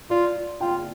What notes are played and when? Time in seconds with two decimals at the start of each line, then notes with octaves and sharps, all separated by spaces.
0.10 F4 D5
0.61 F4 G5